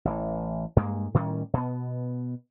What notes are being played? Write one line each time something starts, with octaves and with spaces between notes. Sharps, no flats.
A1 E3
G2 G#3 A#3
A2 D#3 G3 C#4
B2 B3